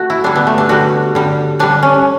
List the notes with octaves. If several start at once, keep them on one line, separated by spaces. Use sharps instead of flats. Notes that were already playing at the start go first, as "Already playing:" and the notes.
Already playing: A3 F#4
E4
D3 G3 D4
B3
A3
D4
D3 G3 F#4
D3 G3
D3 G3 D4
C#4